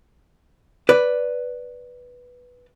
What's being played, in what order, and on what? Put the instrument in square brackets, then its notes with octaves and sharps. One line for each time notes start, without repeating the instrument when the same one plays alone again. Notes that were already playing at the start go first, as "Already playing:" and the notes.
[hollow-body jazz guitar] B4 D5